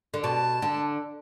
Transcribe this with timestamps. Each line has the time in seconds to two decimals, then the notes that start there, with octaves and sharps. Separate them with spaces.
0.14 D3
0.23 B2 A5
0.62 D3